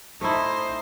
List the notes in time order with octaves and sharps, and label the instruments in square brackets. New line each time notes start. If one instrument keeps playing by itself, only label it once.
[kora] A3 E4 [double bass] D#4 [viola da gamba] C5